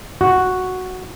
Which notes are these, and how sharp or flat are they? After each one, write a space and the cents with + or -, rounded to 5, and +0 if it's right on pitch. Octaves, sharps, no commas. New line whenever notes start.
F#4 +0